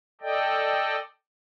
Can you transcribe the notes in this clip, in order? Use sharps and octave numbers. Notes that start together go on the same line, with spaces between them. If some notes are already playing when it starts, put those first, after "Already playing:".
A4 D5 D#5 G5